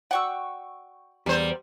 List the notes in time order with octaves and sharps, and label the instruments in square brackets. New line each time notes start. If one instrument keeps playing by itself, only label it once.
[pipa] F#4 D5 F#5 [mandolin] G5 C#6 E6
[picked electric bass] E2 [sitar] G3 C5 [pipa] B3 C4 A#4